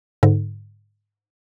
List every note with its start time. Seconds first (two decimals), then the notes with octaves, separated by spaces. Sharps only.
0.23 G#2 D3